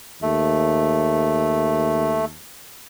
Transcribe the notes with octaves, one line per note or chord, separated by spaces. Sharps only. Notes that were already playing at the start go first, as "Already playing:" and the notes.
D#2 A3